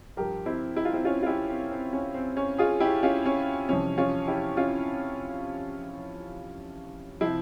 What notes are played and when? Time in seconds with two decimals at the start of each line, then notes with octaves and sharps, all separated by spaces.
0.17 G2 F3 G4 A#4
0.46 C4 E4
0.76 E4
0.85 F4
0.93 C4 E4
1.05 C#4 F4
1.22 F4
1.27 E4 G4
1.50 C4
1.71 C4
1.93 C#4
2.14 C4
2.37 C#4
2.58 F4 G#4
2.80 E4 G4
3.03 C#4 F4
3.26 C#4
3.69 F2 C3 E3 G3 C#4
3.98 C#4 F4
4.28 E4 G4
4.57 C#4 F4
7.21 C3 F3 C4 E4